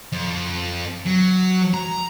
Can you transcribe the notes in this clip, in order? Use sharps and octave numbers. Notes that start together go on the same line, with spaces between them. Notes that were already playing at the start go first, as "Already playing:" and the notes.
F2
F#3
A#5